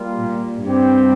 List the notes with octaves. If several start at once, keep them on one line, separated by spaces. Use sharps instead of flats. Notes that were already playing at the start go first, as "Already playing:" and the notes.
Already playing: G3 A#3 F4
A#2
G2 G3 C4 G4